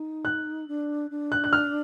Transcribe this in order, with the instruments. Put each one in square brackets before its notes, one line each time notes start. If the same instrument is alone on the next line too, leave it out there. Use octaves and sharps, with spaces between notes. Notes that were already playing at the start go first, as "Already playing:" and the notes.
Already playing: [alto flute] D#4
[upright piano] F#6
[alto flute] D4
D4
[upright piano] F#6
F#6
F6